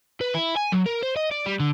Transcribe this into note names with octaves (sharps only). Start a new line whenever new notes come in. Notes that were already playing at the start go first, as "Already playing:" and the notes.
B4
E4
G#5
F#3
A#4
C5
D#5
D5
G3
D3